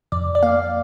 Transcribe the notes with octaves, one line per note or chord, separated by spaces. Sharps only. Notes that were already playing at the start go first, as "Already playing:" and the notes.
F2 D5
D5
A#3 F5